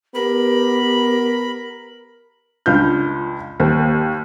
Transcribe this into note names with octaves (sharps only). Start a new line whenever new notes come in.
B3 G4 A#4 B5
C#2 D4 F4 F6 G6
D#2 C5